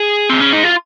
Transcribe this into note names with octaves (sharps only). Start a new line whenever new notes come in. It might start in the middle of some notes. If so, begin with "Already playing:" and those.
Already playing: G#4
C4
C#4
D#4
F4